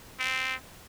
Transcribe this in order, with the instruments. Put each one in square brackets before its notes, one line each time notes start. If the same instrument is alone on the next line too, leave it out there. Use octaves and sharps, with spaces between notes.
[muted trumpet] C4